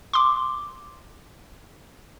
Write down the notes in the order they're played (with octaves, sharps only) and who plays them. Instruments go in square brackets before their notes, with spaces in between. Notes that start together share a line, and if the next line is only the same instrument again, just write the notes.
[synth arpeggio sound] C6 D6